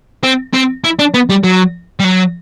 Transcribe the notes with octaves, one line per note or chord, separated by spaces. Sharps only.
C4
C4
E4
D4
B3
G3
F#3
G3
F#3